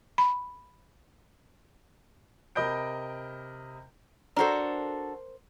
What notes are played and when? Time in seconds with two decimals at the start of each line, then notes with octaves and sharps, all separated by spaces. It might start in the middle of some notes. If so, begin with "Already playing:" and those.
0.18 B5
2.55 C3 A#4 D#5 B5 G6 D7
4.36 D4 F#4 A4 A#4 C5